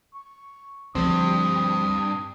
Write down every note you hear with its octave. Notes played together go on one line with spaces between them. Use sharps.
C#6
D2 G2 F3 C4 D#6